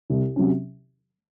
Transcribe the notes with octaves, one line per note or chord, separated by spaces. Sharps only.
C2
C3 F#3 C#4